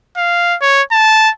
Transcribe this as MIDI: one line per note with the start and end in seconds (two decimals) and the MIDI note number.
0.17 0.56 77
0.61 0.82 73
0.91 1.30 81